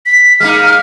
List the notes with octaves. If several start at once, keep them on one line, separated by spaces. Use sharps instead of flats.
B6
G#3 A#3 D#4 F6